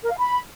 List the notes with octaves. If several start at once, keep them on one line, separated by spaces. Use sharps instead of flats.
A#4
F5
B5